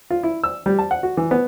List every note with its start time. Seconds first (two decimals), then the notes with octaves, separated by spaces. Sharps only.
0.10 F4
0.23 E4
0.44 E6
0.66 G3
0.79 A5
0.91 F#5
1.03 F#4
1.17 E3
1.31 B3